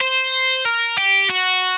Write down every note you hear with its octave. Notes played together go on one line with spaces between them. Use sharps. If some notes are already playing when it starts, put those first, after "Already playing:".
C5
A#4
G4
F#4